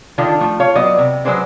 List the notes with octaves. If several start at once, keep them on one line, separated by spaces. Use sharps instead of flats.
D3 D#3 D4 F4
F3 A3
F4 C#5 F5
F#3 B3 D5 D#5
C3
F#3 G#3 B4 C5 D5